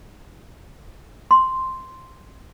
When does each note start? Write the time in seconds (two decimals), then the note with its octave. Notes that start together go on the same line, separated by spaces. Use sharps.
1.31 C6